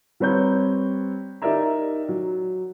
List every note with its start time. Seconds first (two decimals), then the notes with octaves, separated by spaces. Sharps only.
0.20 G3 C4 B4 C#5 A#5 G6
1.42 D#4 G4 A#4 D5 E5 A#5
2.09 F#3